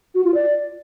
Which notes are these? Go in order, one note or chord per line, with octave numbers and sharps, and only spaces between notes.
F#4
F4
D5